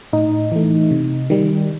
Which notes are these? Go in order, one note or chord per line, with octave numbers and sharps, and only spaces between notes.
A2 D#4
E3 A3
C3
D#3 G3